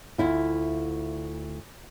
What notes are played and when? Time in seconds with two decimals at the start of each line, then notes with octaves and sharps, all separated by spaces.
0.18 D2 E4 F4